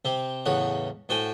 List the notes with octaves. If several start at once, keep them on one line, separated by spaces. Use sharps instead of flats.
C3 C4
A1 E2 C#3 C#5 F#5
A2 F#4 C5 G5 G#5